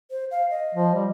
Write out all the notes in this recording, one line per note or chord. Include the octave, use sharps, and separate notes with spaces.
C5
F5
D#5
F3
G3